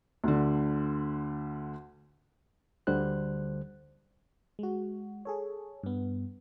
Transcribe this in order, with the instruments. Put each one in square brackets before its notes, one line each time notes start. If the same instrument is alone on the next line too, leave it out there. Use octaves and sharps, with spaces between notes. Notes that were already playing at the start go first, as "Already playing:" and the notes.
[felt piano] D2 D3
[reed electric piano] D2 D3 G3 C5 F#6
[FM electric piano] G#3 F#4
G#4 A4 C#5
G2 B3